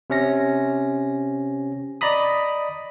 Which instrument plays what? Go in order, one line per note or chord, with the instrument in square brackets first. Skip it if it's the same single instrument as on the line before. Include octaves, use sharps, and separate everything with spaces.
[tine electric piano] C3 C#4 A#6
D5 D#5 A#5 B5 D#6